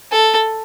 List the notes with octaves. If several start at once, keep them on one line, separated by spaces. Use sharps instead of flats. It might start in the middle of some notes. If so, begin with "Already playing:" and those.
A4